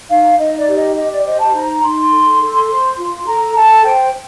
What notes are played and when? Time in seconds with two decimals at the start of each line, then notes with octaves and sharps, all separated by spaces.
0.09 D#4 F5
0.38 D#4 D#5
0.57 D5
0.67 G4
0.76 D#5
0.96 G4 D#5
1.10 D5
1.24 C5 D#5
1.39 A5
1.54 D#4 A#5
1.83 D#4 C6
2.11 A4
2.40 A4
2.69 C5
2.98 F4
3.27 A4 A#5
3.55 A4 A5
3.84 C5 G5